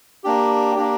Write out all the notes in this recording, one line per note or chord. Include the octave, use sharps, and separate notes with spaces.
A#3 D4 G4
A#3 D4 G4